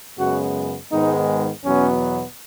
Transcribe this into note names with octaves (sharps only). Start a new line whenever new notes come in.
F#2 C#3 G#3 B3 F#4
G#2 D#3 G#3 B3 D#4
E2 B2 F#3 B3 C#4